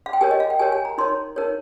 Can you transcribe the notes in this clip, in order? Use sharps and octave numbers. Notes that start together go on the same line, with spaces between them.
F5
G5
G4 A#4 C#5 G#5
D#5
F5
G5
G4 A#4 C#5 G#5
G#5
A#5
D#4 A#4 C#5 C6
D#4 A#4 C#5